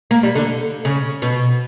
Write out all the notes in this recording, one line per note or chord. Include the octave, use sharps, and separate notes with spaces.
A#3
G3
D3
C#3
B2